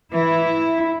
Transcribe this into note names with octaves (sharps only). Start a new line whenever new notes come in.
E3 E4